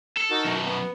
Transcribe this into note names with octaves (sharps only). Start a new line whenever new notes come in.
A4
D#4 F#4 A#4
F#2 B2
B3